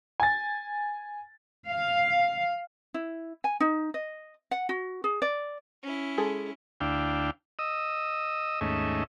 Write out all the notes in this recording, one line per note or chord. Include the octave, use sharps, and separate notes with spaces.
G#5 A6
F5
E4
G#5
D#4
D#5
F#5
F#4
G#4
D5
C#4 E4
G#3 G#4 A4
D2 D4 E4 F5 G5
D#5 D#6 E6
D#2 G#2 A3 C#4 D#5 E5